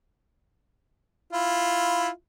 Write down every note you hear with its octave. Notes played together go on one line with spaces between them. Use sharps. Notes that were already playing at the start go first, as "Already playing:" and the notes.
E4 F4